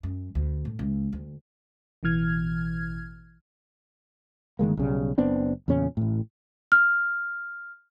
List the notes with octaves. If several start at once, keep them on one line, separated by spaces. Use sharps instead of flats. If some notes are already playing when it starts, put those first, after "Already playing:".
F#2
D2
A2
C#2
D2
A1 B2 E3 F6 G#6
G1 D#3 G#3 A#3
B1 C#3 G3
F#1 B3 C4 D4
E2 A#2 C#3 C#4
A1 A2
F6